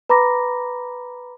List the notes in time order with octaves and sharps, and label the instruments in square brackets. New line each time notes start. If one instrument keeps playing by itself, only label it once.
[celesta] B4 A#5 B5 D6 A#6